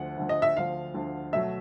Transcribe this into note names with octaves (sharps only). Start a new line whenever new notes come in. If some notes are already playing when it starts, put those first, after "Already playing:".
Already playing: D2 D3 F3 F#5
D2 D3 F3
D#5
E5
D2 D3 F3 F5
D2 D3 F3
B2 F#3 A3 E5